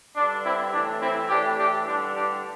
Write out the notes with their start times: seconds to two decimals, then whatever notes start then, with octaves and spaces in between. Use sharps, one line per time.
0.15 G2 D3 D4
0.44 C4 E4
0.72 A2 E3 D4 G4
1.01 C4 E4
1.29 A2 E3 D4 G4
1.58 D4 G4
1.86 G2 D3 D4
2.15 D4 G4